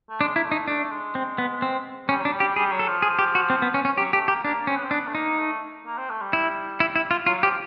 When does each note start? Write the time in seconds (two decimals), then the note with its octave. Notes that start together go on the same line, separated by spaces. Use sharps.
0.09 A3
0.21 G#3 D4
0.35 A#3 E4
0.44 A3
0.52 D#4
0.67 A3 D4
0.91 G#3
1.15 C4
1.38 B3
1.62 C4
2.08 G3 C#4
2.21 F#3 D4
2.32 G3
2.40 G4
2.56 G3 G#4
2.71 F#3
2.79 A4
2.87 F3
3.02 G#4
3.19 G4
3.35 F#4
3.50 C4
3.62 B3
3.74 C#4
3.85 C#4
3.98 F#3 G4
4.13 A3 G4
4.28 A#3 G4
4.44 A#3 D4
4.67 C4 C#4
4.75 B3
4.83 C4
4.91 B3 D4
5.08 A3
5.14 A#3 D#4
5.38 A3
5.86 A#3
5.98 C4
6.10 A3
6.21 G3
6.33 E4
6.80 E4
6.96 E4
7.11 F4
7.26 F#3 F4
7.42 F3 G4